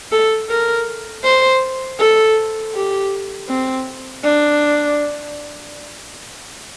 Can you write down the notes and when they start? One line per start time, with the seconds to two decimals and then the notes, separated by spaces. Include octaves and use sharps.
0.12 A4
0.50 A#4
1.24 C5
1.99 A4
2.74 G4
3.49 C4
4.24 D4